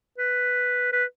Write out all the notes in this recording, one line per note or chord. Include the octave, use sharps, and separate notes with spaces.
B4
B4